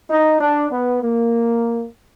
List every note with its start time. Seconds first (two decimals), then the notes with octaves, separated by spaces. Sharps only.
0.10 D#4
0.41 D4
0.71 B3
1.02 A#3